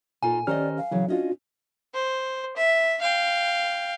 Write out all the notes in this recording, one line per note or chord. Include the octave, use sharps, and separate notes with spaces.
A#2 D#4 F4 A4 G#5
D#3 C#4 G4 C5 D5 D#5 F6
F5
C#3 E3 F#3
C#4 D4 F4 F#4 D#5
C5
E5
F5 G5